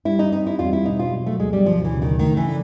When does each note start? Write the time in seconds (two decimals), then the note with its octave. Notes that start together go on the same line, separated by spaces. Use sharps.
0.05 G3 E4
0.19 D#4
0.32 C4 D#4
0.46 E4
0.59 E2 F4
0.73 E4
0.86 B2 D#4
0.99 F4
1.13 F#3
1.26 A3
1.39 D2 G#3
1.53 G3
1.66 D2 F3
1.84 E3
1.93 C#3
2.02 D#3
2.19 D#3 A3
2.37 E3
2.47 D4